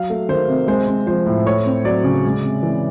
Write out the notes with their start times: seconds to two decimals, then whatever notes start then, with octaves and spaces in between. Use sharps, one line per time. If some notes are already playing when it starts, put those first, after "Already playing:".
Already playing: F#3 F5
0.10 A3
0.29 D#3 C5
0.48 C3
0.68 G#3 C5
0.87 C4
1.07 F3 C5
1.26 A2
1.46 A3 C#5
1.66 C4
1.85 F#3 D5
2.04 C#3
2.25 G#3
2.43 C3
2.63 E3